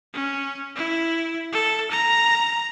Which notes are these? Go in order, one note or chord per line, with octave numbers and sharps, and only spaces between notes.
C#4
E4
A4
A#5